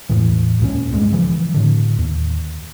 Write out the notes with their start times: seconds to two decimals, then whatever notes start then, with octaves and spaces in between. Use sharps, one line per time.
0.09 E2 A2 E3
0.60 C#2 A#2 C#4
0.92 D1 G2 G#3
1.12 C#3 E3 F3
1.54 A2 D3
1.98 D#2